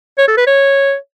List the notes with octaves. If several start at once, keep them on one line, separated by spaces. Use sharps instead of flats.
C#5
A4
B4
C#5